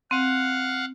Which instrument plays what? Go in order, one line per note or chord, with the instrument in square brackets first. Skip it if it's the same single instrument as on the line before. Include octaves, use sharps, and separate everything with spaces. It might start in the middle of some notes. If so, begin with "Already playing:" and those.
[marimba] C4 [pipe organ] F5 F#5